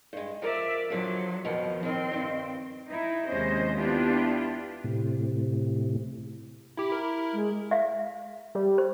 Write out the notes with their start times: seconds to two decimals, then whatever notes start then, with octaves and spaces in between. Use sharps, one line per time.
0.13 G2 G#3
0.42 F3 A#4 D5 E5
0.90 D3 F3 F#3 F4
1.45 F2 B2 D#3 F3
1.83 D#2 D#3 C4
2.12 G2 D#3
2.88 D#4 E4
3.27 D#2 C3 G#3 C#4 C5 D#5
3.77 B3 D4 E4 F4 G4
4.84 A2 C3
6.77 E4 G4
6.90 E4 A#4
7.33 G#3
7.71 E5 F5
8.55 G3
8.78 C5